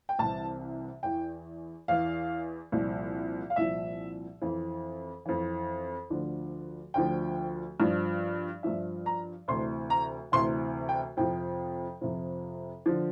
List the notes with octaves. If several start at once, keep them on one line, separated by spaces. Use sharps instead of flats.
G5
C2 C3 E3 A5
E2 E3 G5
E2 E3 F5
C2 A#2 F3
F5
C2 A#2 F3 E5
F2 E3
F2 E3
D2 D3 F3
D2 D3 F3 G5
G2 F3
G2 F3 E5
A#5
D2 C3 E3 C6
A#5
D2 C3 E3 C6
G5
F2 C3 F3 G5
F2 C3 F3
D3 F3